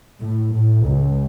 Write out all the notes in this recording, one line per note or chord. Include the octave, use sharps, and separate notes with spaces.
A2
A2
C#2